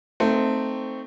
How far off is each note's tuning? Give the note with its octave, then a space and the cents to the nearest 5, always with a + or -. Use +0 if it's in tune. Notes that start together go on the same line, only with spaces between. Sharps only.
A3 +15 C4 +0 D#4 +0